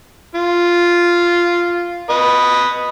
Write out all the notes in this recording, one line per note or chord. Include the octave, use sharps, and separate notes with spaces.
F4
B4 D#5